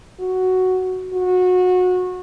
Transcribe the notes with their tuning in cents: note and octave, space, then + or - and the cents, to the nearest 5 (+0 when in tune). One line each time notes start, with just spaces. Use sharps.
F#4 +5
F#4 -25